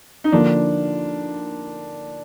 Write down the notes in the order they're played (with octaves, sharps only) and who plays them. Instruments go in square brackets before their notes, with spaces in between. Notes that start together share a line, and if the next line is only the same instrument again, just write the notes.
[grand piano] D#4
[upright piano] D3 F3 A#3 [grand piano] D4